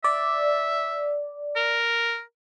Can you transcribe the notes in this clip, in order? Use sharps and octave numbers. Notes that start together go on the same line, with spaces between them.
D5 E5
A#4